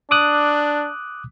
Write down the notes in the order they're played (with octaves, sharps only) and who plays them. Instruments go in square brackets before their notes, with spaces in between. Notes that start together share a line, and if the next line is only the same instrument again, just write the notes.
[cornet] D4 [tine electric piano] D6 D#6 F#6